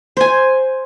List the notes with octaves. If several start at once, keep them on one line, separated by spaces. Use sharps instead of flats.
C5 G#5